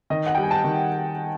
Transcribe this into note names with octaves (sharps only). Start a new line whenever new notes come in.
D#3 D#5
F#5
G3 G5
G#5
A5
D#3